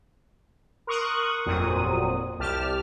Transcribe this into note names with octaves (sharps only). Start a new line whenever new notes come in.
A#4 C6 C#6 D#6 F#6
G1 F2 A#2 F#3 C4 D#6
C2 G4 A5 F6